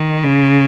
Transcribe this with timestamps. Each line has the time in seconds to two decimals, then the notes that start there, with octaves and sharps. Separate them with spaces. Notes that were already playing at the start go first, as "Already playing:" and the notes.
Already playing: D#3
0.23 C#3